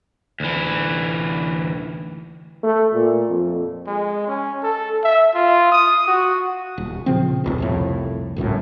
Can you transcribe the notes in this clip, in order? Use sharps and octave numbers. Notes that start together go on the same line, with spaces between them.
D2 E3
A3
A#2
F2
G#3
C#4
A4
E5
F4
D#6
F#4
D#1
A#2 C#3 F3 C4
F1 C#2 B2
C2 F2 A2
G#1 C#2 F#2 A2